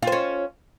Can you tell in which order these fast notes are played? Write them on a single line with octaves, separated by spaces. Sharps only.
F4 C5 C#4